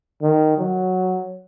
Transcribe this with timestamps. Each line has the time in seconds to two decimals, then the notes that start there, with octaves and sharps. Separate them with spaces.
0.22 D#3
0.58 F#3